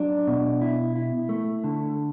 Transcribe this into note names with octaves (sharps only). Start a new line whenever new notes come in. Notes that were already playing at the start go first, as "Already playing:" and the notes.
Already playing: F#3 D4
B2
E4
E4
A3
D3